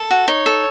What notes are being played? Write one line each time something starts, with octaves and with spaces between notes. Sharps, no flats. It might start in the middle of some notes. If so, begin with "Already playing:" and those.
Already playing: A4
F#4
D#4 C#5
A4